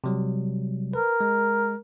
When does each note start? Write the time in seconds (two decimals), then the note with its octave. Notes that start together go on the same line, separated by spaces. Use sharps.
0.04 C3 F#3 G3
0.94 A#4 B4
1.21 G#3